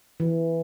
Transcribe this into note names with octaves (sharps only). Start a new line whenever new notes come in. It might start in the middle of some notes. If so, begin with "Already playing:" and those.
E3